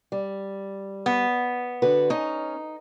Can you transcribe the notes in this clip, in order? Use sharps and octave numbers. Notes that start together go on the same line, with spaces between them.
G3
B3
D3 F#4 B4
C#4 D#4